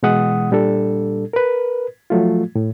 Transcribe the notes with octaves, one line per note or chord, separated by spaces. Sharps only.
B2 E3 G#3 F#5 D#6
A#2 G3 D4 A4
A#4 B4
F3 F#3 A3 F4
A2